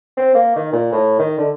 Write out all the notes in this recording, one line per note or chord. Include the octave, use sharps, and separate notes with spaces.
C4
A#3
D#3
A#2
A2
D#3
D3